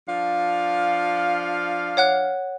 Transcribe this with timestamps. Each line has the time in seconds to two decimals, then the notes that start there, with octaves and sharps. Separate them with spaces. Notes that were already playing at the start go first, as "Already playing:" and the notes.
0.09 F3 D4 F5
1.97 C#5 F#5 F#6